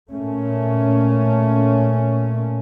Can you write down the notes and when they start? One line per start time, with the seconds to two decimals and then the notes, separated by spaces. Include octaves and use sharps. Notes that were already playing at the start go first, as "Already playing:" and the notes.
0.11 A#2 A3 C#4